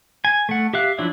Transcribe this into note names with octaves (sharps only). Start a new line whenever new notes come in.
G#5
A3 F#5
G4 E5 F5 F#6
F3 F#3 D4 E4